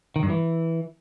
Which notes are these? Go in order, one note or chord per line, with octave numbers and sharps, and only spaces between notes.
D#3
G2
E3